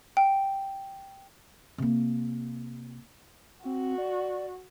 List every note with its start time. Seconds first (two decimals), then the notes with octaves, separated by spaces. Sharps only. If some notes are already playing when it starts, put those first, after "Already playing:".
0.17 G5
1.78 C3 A#3
3.65 C4 F#4
3.98 D5